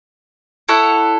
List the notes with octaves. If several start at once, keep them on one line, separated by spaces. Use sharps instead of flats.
E4 A4 C#5 F#5